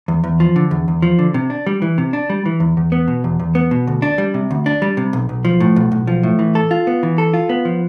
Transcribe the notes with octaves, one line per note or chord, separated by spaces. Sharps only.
E2
E2
F3
D3
E2
E2
F3
D3
C3
D4
G3
E3
C3
D4
G3
E3
E2
E2
B3
B2
E2
E2
B3
B2
D2
D4
G3
C3
D2
D4
G3
C3
B1
B1
F3
A2
B1
B1
F3
A2
E3
A4
F4
B3
E3
A4
F4
B3
F3